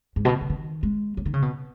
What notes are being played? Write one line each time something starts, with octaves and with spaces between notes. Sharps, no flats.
G#2
B2
C#3
D#3
G#3
F#3
D#3
C#3
B2